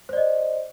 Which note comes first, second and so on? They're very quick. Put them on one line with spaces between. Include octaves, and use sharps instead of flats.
C5 D5 D#5